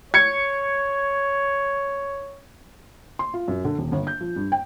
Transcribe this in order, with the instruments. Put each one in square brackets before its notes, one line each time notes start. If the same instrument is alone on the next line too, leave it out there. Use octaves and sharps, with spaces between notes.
[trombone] C#5 [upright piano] G#6 C#7
[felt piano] C6
F4
F#2
D3
D#1
G1
G6
F3
G2
G5